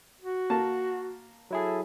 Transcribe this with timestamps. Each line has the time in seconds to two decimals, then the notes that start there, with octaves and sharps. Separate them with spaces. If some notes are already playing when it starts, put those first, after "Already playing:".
0.22 F#4
0.50 A#3 A5
1.51 F#3 E4 G#4 A4